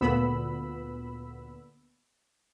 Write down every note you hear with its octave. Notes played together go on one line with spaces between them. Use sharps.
D2 A#2 B3 B5 E6